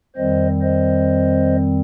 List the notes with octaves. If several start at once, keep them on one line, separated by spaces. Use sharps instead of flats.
F2 D#3 G3 C4 C5 D#5
C5 D#5